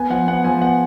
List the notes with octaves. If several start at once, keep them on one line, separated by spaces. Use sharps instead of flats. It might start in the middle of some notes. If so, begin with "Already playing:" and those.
Already playing: B3 G#5
F3 F#5
B3 F#5
F3 G#5
B3 F#5